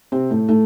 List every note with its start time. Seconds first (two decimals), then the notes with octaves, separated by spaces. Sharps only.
0.12 C3 C4
0.30 A2 A3
0.49 A2 A3